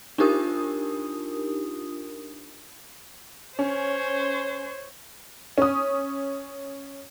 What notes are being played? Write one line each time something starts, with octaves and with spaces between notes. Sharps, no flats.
D4 D#4 F4 G4 A#4 D#6
C#4 C5 C#5
C#4 D#6